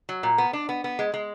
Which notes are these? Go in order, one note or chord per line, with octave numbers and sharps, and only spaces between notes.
F#3
A#2
B3
D4
B3
B3
G#3
G#3